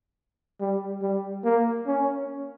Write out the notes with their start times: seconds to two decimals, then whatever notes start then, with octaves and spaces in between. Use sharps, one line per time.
0.61 G3
1.02 G3
1.45 A#3
1.87 C#4